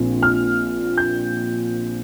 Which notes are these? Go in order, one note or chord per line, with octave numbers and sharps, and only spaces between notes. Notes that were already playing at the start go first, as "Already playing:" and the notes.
Already playing: A#1 A#2 F3 C4
F6
G6